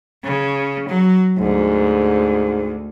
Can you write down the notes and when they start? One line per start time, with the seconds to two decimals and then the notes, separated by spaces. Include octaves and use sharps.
0.24 C#3
0.89 F#3
1.38 D2 G#2